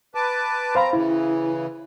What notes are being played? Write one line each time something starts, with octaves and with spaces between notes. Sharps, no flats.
B4 A5 D6
C4 C5 F5 A#5 B5
C#3 E3 E4